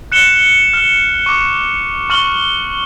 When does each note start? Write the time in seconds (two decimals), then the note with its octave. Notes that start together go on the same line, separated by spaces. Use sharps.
0.12 F#6 C#7 E7 G7
0.74 F6
1.26 C#6 D6
2.10 C#6 F6 F#7 G7